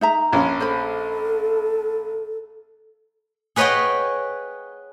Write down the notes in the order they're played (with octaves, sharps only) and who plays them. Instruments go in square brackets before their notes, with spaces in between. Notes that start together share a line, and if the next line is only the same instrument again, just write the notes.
[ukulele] D#4 E5 A#5
[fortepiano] A#1 C#4
[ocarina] A4 [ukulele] C5 D#5 B5
[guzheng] G#4 B4 C#5 D#5 F#5 G5